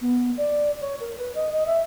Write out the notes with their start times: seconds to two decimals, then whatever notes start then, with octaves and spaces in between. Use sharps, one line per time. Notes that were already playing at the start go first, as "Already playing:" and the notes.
0.01 B3
0.37 D5
0.81 C#5
1.00 A#4
1.18 B4
1.35 D#5
1.53 D#5
1.66 E5